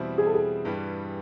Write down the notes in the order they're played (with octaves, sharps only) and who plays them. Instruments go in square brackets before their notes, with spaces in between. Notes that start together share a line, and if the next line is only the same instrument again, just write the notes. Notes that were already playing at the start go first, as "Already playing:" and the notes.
Already playing: [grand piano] E2 B2 G3 C4 E4
[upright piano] G#4
A4
G#4
[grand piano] G2 E3 G3